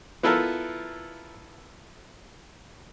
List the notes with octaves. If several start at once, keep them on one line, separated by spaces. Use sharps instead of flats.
B3 E4 F4 A4 A#4 E5